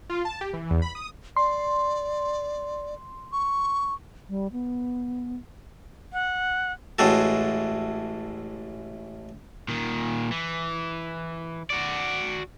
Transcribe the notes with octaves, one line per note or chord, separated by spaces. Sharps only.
F4
A5
G4
E3
E2
B5
D#6
D5 C6
C#6
G3
B3
F#5
A1 A2 G#3 F#4 A4
A#2 D#3
E3
F#4 D5